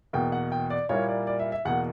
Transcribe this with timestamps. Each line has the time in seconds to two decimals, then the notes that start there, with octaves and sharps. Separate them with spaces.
0.13 E2 B2 A#3 G5
0.32 F#5
0.52 G5
0.70 D5
0.89 A#2 G3 A#3 E4 C#5
1.08 D5
1.27 D5
1.40 E5
1.52 E5
1.65 E2 B2 A#3 F#5